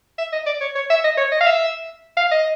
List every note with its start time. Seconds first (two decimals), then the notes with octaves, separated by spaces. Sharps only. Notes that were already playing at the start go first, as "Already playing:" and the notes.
0.18 E5
0.32 D#5
0.47 D5
0.61 C#5
0.76 C#5
0.90 E5
1.04 D#5
1.18 C#5
1.32 D#5
1.41 F5
1.46 E5
2.17 F5
2.31 D#5